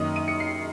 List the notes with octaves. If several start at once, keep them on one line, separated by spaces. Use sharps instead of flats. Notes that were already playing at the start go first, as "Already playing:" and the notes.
Already playing: F#2 D#3 A#3 D#4 D#6
D#7
C#7
C7